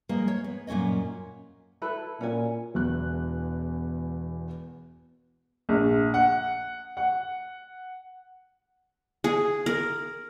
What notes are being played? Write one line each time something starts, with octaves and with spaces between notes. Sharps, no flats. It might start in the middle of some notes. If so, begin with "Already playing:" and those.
F3 G3 G#3 A#3
C#5
B3
F#2 A#2 C#4 C#5 D#5
E4 A4 B4
A#2 C#4 G#5
E1 E2 F#6
A#1
F#5
F#5
G#4
A#4